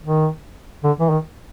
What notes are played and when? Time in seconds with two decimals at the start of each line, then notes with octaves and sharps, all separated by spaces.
0.04 D#3
0.84 D3
1.00 E3
1.10 D#3